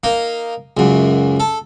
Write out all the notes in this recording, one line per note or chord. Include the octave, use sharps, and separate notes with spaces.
A#3 D#4
C#2 F#2
A4